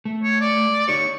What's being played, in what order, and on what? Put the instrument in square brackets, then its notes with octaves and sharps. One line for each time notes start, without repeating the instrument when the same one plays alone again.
[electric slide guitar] A3
[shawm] C#5
D5
[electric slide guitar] D#4 G4 C#5 [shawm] C#6